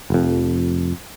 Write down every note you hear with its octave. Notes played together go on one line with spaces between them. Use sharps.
F1 F2